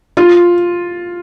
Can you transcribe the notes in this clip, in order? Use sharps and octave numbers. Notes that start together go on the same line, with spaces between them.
F4